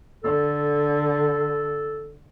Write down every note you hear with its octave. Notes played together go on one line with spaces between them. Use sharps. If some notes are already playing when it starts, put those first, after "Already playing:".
D3 A4